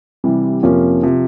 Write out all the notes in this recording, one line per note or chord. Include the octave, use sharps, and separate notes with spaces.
C3 E3 G3
F2 C3 F3 A#3 C#4
C3 F3